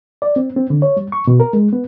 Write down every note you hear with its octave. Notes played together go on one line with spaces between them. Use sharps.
D5
C4
C4
D3
C#5
G3
C#6
B2
A#4
G#3
B3